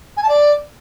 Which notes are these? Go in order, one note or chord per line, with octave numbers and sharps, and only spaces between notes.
G#5
A5
D5